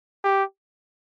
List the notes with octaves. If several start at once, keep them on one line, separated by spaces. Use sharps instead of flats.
G4